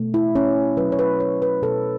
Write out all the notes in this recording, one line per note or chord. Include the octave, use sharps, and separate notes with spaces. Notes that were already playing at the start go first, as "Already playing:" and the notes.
Already playing: B2 A3
E4
C#4
B2 F#3 A3 B4
C#5
B4
C#5
B4
B2 F#3 A3 A4